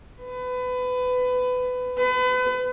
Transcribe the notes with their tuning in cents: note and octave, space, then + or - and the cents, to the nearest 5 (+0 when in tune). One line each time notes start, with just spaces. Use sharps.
B4 +25
B4 +35